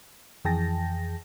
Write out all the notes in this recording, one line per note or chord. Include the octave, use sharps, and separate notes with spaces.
F2 E3 G#4 G5 A5 A#6